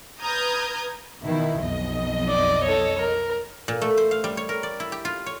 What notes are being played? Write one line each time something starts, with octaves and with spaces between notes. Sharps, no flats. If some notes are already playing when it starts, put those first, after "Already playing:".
B4 A#5 D#6 F6 G6 G#6
B2 D#3 E4
B1 F2 D#5
D5
A4 C#5
A#4
A#2
A3
C5
F5
G3
C#5
A#4
D5
E4
G4
F4
C#5